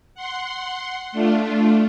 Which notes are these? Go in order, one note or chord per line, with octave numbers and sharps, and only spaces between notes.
F#5 C6
A3 D4 F4